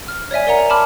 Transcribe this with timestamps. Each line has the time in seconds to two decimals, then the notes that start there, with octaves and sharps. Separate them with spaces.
0.08 F6
0.31 C#5 D5 E5 G#5
0.47 A#4 D5 F#5 A#5
0.70 A5 B5 D6 F6